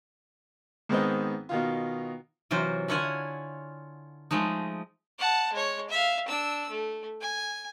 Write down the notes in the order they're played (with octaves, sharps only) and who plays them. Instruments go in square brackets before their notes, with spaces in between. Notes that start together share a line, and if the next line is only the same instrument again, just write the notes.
[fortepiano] G#2 D#3 B3 C4 B4 D#5
B2 D#3 F4
[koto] C3 E3 F#3 F4 C5
D3 E4 F4 C#5 F#5 G#5
F3 G#3 A3 D#4
[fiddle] F#5 A5
G#3 C#5
E5 F5
D4 E6
A3
G#5